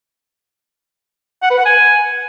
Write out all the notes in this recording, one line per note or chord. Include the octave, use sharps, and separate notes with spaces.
F#5
B4
F#5
G#5